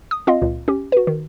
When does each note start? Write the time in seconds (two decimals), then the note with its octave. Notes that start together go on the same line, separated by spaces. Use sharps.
0.11 D#6
0.27 C4 F4 D#5 F5
0.42 C#2 A#2
0.68 C#4 G4
0.92 F#4 B4
1.07 D#3